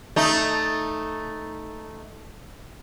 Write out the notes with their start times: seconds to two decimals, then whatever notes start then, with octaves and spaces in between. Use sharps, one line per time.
0.16 A3 D#4